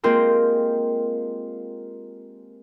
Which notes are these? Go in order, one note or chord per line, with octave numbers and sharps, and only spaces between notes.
G#3 A#3 C4 F4 G4 A#4